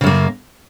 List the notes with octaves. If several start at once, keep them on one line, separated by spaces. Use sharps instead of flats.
F#2 C#3 A#3